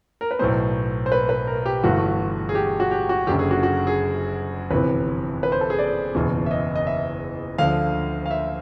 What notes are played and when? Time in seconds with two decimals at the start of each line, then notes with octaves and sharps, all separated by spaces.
0.21 A#4
0.31 B4
0.39 B1 A2 F#3 B3 C5
1.06 C5
1.12 B4
1.29 B4
1.47 A#4
1.66 G4
1.83 G1 G2 E3 A3 F#4
2.49 G#4
2.55 G4
2.80 F#4
2.91 G4
3.09 F#4
3.27 F#1 F#2 D3 G4
3.39 G#4
3.51 F#4
3.63 F#4
3.87 G#4
4.71 G1 F2 C3 E3 B4
5.43 B4
5.52 C5
5.61 A4
5.70 G#4
5.79 D5
6.15 F#1 E2 B2
6.46 E5
6.51 D#5
6.76 D#5
6.87 E5
7.58 D2 D3 F3 F5
8.26 F5
8.31 E5